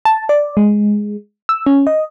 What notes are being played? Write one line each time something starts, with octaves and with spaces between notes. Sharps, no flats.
A5
D5
G#3
E6
C#4
D#5